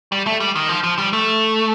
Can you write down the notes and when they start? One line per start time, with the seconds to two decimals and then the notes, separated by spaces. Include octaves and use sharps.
0.12 G3
0.27 A3
0.40 G3
0.55 D#3
0.69 F3
0.83 F3
0.98 G3
1.13 A3